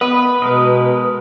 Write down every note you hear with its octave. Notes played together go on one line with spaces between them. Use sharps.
B3 B4 D#5
B2 G#3 A#4 D#5